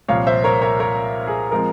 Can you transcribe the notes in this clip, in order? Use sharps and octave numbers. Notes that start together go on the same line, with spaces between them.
C2 A#2 F3 C#5 F5
C5 E5
A#4 C#5
A#4 C#5
A#4 C#5
G#4
F3 G#3 C4 A#4